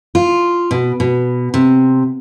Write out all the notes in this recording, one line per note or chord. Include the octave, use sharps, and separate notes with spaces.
F4
B2
B2
C3